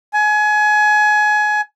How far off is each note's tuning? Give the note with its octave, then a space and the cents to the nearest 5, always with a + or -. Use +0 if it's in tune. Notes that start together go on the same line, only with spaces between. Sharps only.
G#5 +25